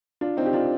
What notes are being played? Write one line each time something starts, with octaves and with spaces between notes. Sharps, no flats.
D4 F4
C4 D#4
G4
D4 F4